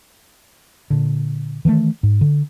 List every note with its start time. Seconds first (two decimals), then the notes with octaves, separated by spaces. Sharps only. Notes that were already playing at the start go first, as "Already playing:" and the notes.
0.90 A#2 D3
1.65 D#3 E3 G#3 A3
2.03 G#2
2.21 D3